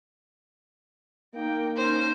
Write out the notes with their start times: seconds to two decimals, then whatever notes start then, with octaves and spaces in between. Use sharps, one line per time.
1.35 A#3 D#4 G5
1.77 C#4 D#4 C5